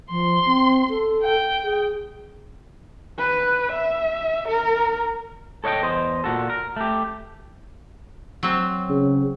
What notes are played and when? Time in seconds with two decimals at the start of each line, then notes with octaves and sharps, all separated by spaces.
0.11 F3 C6
0.46 C4
0.90 A4
1.23 G5
1.64 G#4
3.19 B4
3.72 E5
4.48 A#4
5.64 A4 C#5 D#5 F#5 G5
5.82 E2 C5 D#5
6.24 A#2 F#4 A4
6.50 A#4
6.76 A3 G4
8.43 F#3 C4
8.89 C#3